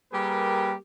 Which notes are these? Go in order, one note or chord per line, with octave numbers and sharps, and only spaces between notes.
G3 A#3 G4 G#4 A#4 B4